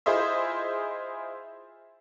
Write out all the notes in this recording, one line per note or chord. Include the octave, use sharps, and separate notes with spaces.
E4 F4 G#4 C5 D#5 E5